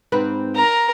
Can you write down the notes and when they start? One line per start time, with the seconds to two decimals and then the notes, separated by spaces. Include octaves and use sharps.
0.12 G#2 C4 B4
0.55 A#4 A#5